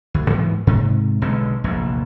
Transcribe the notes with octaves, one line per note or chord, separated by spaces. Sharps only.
D2
G#2 E3 F#3 B3
G#2 C3
B1 B2 D3 G#3
F1 A#1 E2